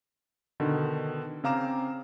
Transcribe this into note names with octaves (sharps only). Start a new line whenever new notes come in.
B2 D3 D#3
C#3 C4 F5 A#5 D6 E7